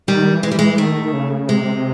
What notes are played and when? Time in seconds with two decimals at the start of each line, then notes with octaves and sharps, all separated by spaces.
0.07 D#3 G3
0.32 E3
0.43 G#3
0.51 G3
0.55 E3 G#3
0.78 D#3 A3
1.13 C#3
1.48 C3 G#3